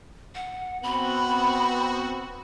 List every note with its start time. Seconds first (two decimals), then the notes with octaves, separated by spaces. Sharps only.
0.35 F#5
0.83 B3 C4 F#4 B5